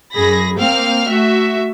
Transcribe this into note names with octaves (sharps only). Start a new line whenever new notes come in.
F#2 G#4 B5 A#6
A#3 C4 F5 G5 F6
A3 F#4 E5